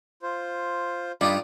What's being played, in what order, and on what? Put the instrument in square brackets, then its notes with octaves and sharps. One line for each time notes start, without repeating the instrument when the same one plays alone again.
[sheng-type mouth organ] F4 C5
[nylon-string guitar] G2 [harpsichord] D4 D#4 F4 [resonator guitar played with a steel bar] D5 [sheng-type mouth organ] B5